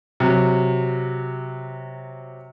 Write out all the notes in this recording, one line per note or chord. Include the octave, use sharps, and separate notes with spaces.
C3 F#3